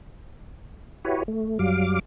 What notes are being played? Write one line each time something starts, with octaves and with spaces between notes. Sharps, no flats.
E4 F#4 G4 B4 C#5
A3
F#2 F#3 G3 F5 D6